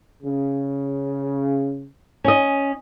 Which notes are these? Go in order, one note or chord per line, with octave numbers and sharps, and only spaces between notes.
C#3
C#4 D#5